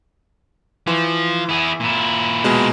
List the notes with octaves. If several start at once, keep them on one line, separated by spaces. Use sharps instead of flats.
E3 F3
E4 G#4
A#2 E4
B2 G#3